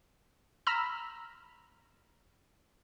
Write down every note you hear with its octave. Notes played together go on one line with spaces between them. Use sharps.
A#5 B5 E6 F6